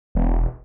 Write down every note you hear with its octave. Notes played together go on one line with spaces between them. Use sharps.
E1